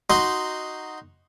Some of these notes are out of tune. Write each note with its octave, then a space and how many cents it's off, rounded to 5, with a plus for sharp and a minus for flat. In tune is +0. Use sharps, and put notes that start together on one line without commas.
D#4 +0 F#4 +0 C6 -5